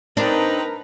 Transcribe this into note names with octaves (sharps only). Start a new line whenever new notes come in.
C4 D4 D#4 A#4 B4 A#5